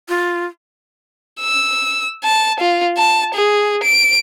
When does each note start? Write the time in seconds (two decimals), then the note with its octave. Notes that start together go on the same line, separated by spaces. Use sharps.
0.09 F4
1.40 E6
2.24 A5
2.59 F4
2.97 A5
3.35 G#4
3.83 D7